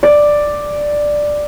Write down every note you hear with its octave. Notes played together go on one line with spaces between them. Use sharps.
D5